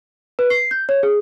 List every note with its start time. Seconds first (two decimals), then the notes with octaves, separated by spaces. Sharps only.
0.39 B4
0.50 C7
0.71 G6
0.89 C#5
1.03 G#4